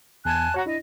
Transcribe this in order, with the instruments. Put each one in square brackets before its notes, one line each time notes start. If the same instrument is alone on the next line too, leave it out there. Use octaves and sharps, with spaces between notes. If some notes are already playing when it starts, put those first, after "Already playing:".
[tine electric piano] E2 G#6 [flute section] G#5 A5 F#6
[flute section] F#4 [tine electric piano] C#5 F#5 A#5
[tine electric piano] D4 E4 [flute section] D#5